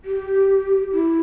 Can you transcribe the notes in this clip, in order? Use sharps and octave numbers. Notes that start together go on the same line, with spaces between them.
G4
E4